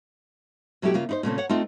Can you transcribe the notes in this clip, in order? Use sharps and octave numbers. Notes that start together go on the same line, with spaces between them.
B2 F#3 A3 E4 G4
C#3 A#3 F4
D#4 E4 C5
A#2 C#3 A3 C4
C#5 F#5
A3 C4 D#4 F4